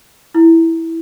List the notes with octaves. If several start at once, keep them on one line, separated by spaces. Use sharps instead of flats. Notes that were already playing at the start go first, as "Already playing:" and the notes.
E4